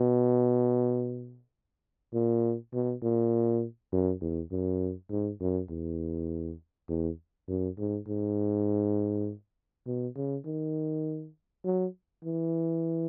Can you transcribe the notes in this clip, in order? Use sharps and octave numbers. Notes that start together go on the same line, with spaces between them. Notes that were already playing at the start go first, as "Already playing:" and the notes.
Already playing: B2
A#2
B2
A#2
F#2
E2
F#2
G#2
F#2
E2
E2
F#2
G#2
G#2
B2
C#3
D#3
F#3
E3